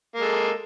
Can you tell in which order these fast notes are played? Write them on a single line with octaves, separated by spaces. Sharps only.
A#3 G#3 A4